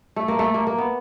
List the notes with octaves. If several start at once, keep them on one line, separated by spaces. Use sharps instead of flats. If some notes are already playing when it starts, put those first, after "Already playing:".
A3
A#3
A3
A#3
A#3
B3